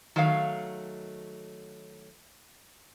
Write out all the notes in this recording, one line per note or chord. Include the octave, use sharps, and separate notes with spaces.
D#3 F#3 A3 C#5 F5